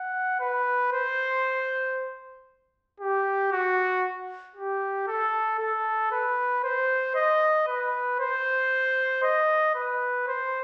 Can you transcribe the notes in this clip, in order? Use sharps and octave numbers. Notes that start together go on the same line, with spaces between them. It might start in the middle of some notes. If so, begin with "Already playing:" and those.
Already playing: F#5
B4
C5
G4
F#4
G4
A4
A4
B4
C5
D#5
B4
C5
D#5
B4
C5